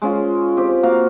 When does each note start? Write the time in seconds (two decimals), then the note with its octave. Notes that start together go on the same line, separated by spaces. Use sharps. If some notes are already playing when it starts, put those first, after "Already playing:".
0.02 G#3 C#4 F4
0.57 C4 G4
0.83 A#3 F#4 F5